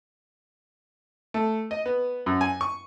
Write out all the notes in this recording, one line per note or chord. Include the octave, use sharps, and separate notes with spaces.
A3
D#5
B3
F#2
G#5
C#6